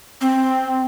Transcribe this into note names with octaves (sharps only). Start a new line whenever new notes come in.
C4